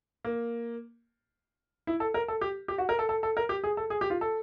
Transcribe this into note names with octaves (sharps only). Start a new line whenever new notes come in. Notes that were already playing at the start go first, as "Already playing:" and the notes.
A#3
E4
A4
A#4
A4
G4
G4
F#4
A#4
A4
A4
A4
A#4
G4
G#4
A4
G#4
G4
F4
A4